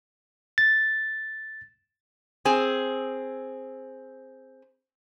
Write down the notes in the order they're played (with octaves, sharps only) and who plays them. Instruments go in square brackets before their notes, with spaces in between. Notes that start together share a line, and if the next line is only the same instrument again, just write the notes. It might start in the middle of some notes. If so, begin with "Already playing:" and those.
[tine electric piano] A6
[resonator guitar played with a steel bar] C4 G#4